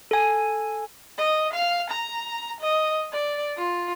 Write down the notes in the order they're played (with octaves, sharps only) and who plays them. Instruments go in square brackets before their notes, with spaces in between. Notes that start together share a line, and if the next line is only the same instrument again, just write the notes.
[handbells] A4 G#5
[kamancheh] D#5
F5
A#5
D#5
D5
F4